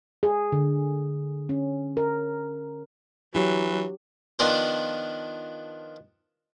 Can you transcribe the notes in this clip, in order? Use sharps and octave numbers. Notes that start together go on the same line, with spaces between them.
G#4
D3
C#4
A#4
E3 F#3 D4 G4
D#3 F3 B3 D4 A#4 C5